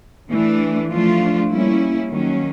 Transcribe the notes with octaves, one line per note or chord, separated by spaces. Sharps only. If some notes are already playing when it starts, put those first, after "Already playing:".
E3 A3 D4
F3 A3 D4 F4
G3 A#3 C#4 E4
D#3 F#3 A#3 C#4